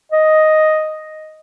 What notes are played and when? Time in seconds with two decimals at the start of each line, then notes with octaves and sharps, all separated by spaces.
0.12 D#5